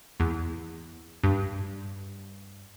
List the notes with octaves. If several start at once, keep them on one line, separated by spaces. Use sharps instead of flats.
E2
G2